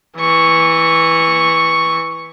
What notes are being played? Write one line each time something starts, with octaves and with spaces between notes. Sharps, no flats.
E3 C#6